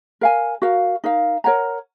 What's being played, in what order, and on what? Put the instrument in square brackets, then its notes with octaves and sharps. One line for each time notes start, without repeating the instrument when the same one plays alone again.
[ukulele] A#4 F5 G#5
F#4 A#4 F5
D#4 A#4 F5
A#4 C#5 F#5 A#5